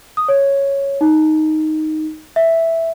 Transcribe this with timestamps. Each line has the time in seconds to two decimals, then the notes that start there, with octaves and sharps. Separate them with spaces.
0.17 D#6
0.28 C#5
1.01 D#4
2.36 E5